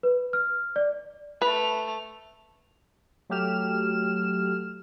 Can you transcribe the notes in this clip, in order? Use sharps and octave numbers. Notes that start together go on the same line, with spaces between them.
B4
F6
D5
A3 B4 F7
F#3 A3 G4 F6 E7